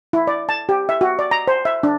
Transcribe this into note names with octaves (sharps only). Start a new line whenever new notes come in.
E4
D5
A5
G4
E5
F#4
D5
A#5
C5
E5
D4